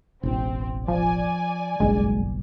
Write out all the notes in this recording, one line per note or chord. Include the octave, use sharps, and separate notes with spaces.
E1 A1 C4
F3 D5 G#5
F#1 B1 G2 G#3